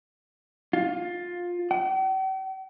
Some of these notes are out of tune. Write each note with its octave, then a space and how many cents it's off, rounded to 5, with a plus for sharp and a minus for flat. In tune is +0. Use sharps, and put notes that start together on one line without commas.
F4 +15
G5 -45